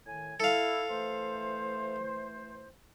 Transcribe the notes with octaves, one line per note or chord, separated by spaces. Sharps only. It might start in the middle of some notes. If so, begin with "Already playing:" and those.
A2 D#3 G#5
E4 A4 F5
E3 A3 C5